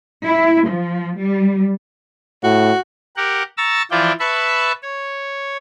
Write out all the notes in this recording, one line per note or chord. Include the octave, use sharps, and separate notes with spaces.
E4
F3
G3
A2 F#4
G4 A#4 F#5
A#5 C#6 E6 A6
E3 F3 E4 F4 D5 G5
B4 E5 A5 B5 C#6
C#5